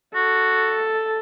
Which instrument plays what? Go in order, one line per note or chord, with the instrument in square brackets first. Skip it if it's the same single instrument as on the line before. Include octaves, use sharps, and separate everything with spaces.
[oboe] F#4 [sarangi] A4